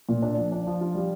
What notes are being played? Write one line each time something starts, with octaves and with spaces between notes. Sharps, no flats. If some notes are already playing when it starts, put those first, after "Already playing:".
A#2
D4
F3
D4
F3
F4
G3